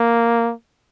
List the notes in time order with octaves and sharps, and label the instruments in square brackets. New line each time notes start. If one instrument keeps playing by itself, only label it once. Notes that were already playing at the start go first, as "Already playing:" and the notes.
Already playing: [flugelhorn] A#3